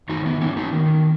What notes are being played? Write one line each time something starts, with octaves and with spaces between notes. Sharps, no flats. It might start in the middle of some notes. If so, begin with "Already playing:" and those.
D#3 D#4 F#4
B3
A#3 C#4
B3 D#4
D#3